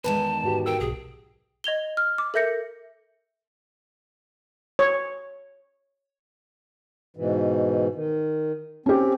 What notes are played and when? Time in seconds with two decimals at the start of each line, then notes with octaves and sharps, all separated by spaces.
0.04 E2 D#3 G#3 B4 A5
0.43 G#2 F#4 G4
0.66 A#4 G5 E6
0.80 B1 G#4
1.64 D#5 G#6 F7 G7
1.97 F6
2.18 D6
2.34 A4 A#4 E5 G6 A#6 C#7
4.79 C#5
7.17 G#2 B2 E3
7.95 D#3
8.86 C4 C#4 G4